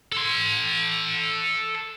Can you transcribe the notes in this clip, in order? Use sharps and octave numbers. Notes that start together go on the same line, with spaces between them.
A4 C6